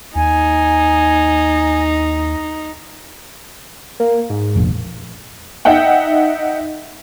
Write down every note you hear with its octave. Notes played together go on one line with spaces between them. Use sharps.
D#2 D#4 G#5
A#3
G#2
F1 A#1
D#4 E5 F#5 G5